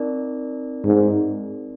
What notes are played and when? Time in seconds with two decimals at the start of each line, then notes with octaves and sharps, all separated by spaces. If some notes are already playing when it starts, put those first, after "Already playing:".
Already playing: C4 D#4 A#4 D5
0.85 G#2